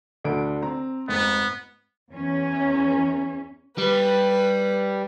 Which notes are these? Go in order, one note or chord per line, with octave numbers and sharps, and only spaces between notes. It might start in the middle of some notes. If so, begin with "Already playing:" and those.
D2 D3 D4 D7
C4 A#5
F1 G#2 B3
E2 C#4
G3 B4